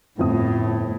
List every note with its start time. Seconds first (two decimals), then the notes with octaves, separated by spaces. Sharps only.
0.18 G1 F2 A2 D#6